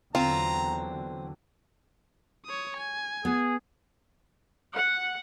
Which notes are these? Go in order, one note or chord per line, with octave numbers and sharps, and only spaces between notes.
E2 D3 F#3 C4 F4 A#5
C#5 D#6
G#5
B3 G#4
F#5